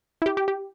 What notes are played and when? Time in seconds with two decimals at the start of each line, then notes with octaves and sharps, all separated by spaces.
0.22 E4
0.26 G4
0.37 G4
0.48 G4